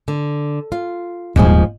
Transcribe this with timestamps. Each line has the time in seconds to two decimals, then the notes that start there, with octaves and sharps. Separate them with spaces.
0.08 D3
0.72 F4
1.36 D#1 G#2 F3 G#4